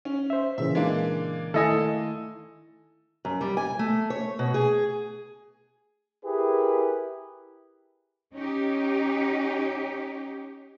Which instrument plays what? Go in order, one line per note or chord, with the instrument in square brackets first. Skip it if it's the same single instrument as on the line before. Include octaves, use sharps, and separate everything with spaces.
[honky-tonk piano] C#4
[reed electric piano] C5 E5
[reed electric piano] A#2 C#3 E3 [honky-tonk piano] E5
[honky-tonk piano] G#3 A#3 D4
[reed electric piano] D#3 A3 E4 [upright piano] A4 D#5 G#5
[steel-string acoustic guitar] F#2
G3
G#5
A3
C#5
B2
G#4
[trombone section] E4 G4 G#4 A#4 B4
[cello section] C#4 D#4 G4